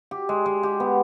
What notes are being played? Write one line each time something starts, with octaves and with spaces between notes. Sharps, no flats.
G4
G#3
G#3
G4
B3